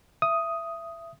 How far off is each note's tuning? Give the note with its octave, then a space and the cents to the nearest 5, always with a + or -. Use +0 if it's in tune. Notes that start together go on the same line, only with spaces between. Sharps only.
E5 +20 D#6 +5